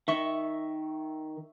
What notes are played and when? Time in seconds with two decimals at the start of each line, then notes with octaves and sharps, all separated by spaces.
0.08 D#3 E5 C#6